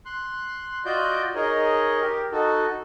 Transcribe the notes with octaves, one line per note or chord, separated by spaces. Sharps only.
C6 F#6
F4 F#4 D5 D#5 G6
D#4 G#4 A#4 C#5 D#5
G4 A#4
D#4 F#4 A4